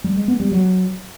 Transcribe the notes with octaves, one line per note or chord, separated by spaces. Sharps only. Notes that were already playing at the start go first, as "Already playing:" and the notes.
G3
G#3
B3
G3
F#3